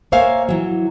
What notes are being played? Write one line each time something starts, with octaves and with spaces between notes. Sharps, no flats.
A#3 C5 C#5 E5 F5 G#5
E3 F#3